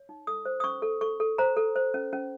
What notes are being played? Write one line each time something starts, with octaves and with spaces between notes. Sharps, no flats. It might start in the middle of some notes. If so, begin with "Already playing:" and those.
Already playing: C#5
D#4
A4 D#6
C5
D#6
C#4 C#6
A4
A4 C#6
A4
C5 A#5
A4
C5
C#4
C#4